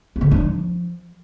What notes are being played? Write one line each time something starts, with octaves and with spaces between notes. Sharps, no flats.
A#3
D3
G3
D4
F3